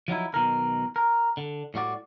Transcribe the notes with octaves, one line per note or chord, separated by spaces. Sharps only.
F3 F#3 D#4 E4
B1 B2 D#3 A#4
A#4
D3
A2 G3 F#4 D5